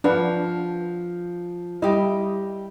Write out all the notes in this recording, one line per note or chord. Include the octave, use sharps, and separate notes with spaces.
F3 D4 B4 F#5
G3 E4 G4 D#5